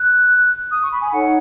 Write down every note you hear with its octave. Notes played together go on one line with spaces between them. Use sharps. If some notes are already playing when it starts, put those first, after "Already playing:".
Already playing: F#6
D#6
C#6
B5
G#5
D#4 A4 C#5 F#5